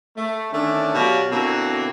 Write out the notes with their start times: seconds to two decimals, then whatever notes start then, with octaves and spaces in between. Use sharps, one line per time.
0.17 A3
0.53 D3 D#3 A3 C#4 D4
0.95 B2 F#3 F#4 G4 D5 F5
1.32 B2 D3 A#3 C4 E4 F#4